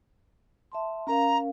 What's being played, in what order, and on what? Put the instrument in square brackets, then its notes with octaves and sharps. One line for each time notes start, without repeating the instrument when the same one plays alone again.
[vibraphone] E5 A5 C6
[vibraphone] C#4 A#4 F5 [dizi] A#5